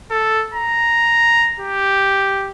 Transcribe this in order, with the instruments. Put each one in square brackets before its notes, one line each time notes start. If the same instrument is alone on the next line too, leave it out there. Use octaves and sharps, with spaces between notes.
[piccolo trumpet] A4
A#5
G4